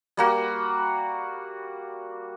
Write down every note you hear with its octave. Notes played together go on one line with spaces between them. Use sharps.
G3 A#3 F#4